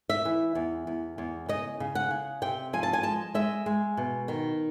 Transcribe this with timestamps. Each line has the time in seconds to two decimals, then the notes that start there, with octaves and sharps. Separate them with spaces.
0.10 E5
0.25 E3
0.55 E2
0.87 E2
1.18 E2
1.49 C#3 D#5
1.80 C#3
1.95 F#5
2.10 C#3
2.42 C3 G5
2.73 F3 G#5
2.83 A5
2.93 G#5
3.03 G#3 A5
3.34 G#3 E5
3.66 G#3
3.97 B2
4.28 D#3